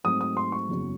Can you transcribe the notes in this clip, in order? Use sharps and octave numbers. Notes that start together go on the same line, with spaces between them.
G#2 F#3 A3 C4 D#6
D#6
C6
C#6
F#1 E2 C#3 F#3